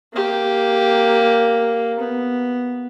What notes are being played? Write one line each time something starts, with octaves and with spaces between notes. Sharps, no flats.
A#3 G4
B3